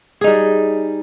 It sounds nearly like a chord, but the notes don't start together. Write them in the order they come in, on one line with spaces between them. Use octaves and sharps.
G#4 D#4 G3